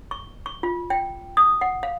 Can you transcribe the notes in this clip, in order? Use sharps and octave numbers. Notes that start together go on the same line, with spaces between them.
C#6
C#6
F4
G5
D#6
F#5
F5